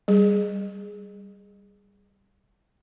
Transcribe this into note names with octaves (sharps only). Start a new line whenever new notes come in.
G3 G#4